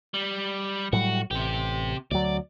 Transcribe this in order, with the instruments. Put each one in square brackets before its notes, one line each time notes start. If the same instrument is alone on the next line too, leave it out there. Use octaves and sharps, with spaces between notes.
[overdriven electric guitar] G3
[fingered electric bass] A2 F#3 G3 [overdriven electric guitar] F#4
[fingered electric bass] A1 [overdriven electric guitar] C3 G4
[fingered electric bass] D2 F#3 [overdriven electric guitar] D5